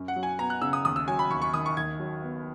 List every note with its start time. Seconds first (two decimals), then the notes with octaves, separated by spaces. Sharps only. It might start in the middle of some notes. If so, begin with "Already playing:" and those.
Already playing: F#2
0.08 F#5
0.16 F#3
0.23 G#5
0.39 B3 A#5
0.50 F#6
0.62 C#3 E6
0.73 D#6
0.85 D#2 D#6
0.96 E6
1.08 F#3 G#5
1.19 B5
1.30 D#2 C#6
1.42 C#6
1.54 D#3 D#6
1.66 C#6
1.77 D#2 G#6
2.00 F#3
2.23 B3